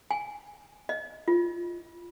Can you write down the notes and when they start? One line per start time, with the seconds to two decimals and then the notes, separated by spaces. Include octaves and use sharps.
0.11 G#5
0.89 D#5
1.28 F4